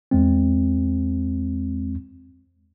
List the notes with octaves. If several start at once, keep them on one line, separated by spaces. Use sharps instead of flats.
E2 G#3 C4